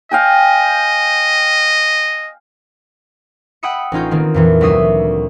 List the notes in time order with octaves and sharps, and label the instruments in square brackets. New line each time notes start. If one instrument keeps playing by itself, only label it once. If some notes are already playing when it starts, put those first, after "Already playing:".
[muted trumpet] D#5 [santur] F5 G5 G#5
[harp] F#5 G5 B5 D#6 E6 C#7
A1 C#4 D#4 F4 G6
D#3 A#3 C4
F2 A#2 E3
D2 F#3 E5 D#6 C7